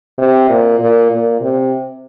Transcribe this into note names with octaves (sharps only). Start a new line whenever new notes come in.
C3
A#2
A#2
A#2
C3